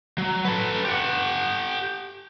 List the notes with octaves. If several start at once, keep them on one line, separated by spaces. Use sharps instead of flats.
F#3
A4 B4
G4 F#5